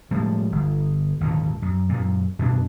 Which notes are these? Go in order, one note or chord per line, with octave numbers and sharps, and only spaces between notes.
A2 F3 G3 G#3
G1
G#1 D#2 A#2 D3
F#2
F#2 A#2
F#2 B2 A3 D4